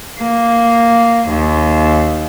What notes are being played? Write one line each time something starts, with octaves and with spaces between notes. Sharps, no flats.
A#3
D#2